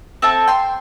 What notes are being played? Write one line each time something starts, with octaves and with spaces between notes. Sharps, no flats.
C4 A4 E5 A5
G5 C6